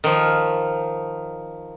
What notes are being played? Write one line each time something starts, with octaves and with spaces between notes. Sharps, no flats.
D#3 F3